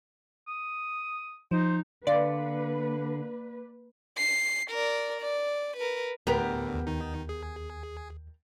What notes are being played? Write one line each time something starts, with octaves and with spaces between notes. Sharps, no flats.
D#6
F3 D#4 C5
D3 A#3 B4 D5 F5 C6
C7
A#4 D5
D5
A#4 B4
D2 A2 D3 B3 G4 A#4
D#2
D#3 D#4
G#4